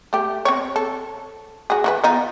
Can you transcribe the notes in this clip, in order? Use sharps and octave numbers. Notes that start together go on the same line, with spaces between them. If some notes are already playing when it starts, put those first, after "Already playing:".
A3 G4
C4 C#5
A4
F#4 G#4
E3 F#4 B4
B3 D#4 F4